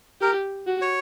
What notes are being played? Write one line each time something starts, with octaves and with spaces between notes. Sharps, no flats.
G4 A#4
F#4
C#5